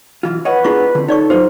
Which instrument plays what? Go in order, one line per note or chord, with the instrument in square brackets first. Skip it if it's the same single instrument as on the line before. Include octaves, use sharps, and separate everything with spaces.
[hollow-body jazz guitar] B1 E3 F4
[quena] B4 [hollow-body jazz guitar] C#5 D#5 F#5
[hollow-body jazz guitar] B3 D4 G#4 [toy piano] E4 F4 C#6
[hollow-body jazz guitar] D3 C4
[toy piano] D#4 D5 C#6 [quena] A4 [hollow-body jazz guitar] C#5
[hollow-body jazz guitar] F#3 D#4 F4 [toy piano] C5